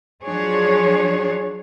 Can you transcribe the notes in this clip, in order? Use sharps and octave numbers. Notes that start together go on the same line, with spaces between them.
F3 F#3 D4 G#4 C#5